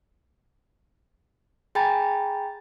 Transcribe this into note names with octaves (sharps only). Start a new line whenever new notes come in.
G#4 G5 G#5 A#5 B5 A6